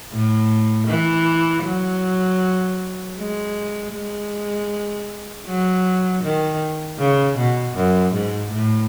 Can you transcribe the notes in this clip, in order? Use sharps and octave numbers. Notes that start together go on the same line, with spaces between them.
A2
E3
F#3
G#3
G#3
F#3
D#3
C#3
B2
F#2
G#2
A2